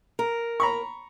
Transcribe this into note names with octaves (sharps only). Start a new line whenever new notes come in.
A#4
A#5 B5 C#6